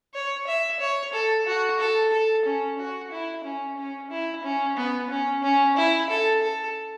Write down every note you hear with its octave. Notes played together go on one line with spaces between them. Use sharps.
C#5
E5
C#5
A4
F#4
A4
A4
C#4
F#4
E4
C#4
C#4
E4
C#4
B3
C#4
C#4
E4
A4
A4